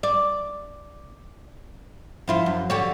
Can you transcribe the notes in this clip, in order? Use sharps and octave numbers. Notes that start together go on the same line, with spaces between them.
D5
F3 E4 F4
F#2
D3 G4 C#5